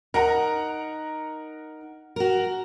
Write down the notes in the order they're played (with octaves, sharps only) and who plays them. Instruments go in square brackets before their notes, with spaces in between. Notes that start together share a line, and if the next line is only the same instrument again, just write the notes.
[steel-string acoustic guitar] D#4 [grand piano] A#4 F#5 A#5
[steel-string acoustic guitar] F#4 A#4